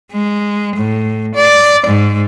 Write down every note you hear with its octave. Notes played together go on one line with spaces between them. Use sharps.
G#3
A2
D5
G#2